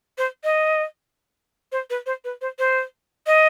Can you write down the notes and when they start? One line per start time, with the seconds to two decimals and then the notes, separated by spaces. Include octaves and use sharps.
0.18 C5
0.44 D#5
1.72 C5
1.90 B4
2.06 C5
2.24 B4
2.41 C5
2.59 C5
3.27 D#5